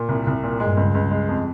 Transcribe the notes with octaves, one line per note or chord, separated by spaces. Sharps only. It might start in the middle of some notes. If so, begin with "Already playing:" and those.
Already playing: A#2
C2
C2
A#2
G2 G#3
C#2
C#2
G#3
F2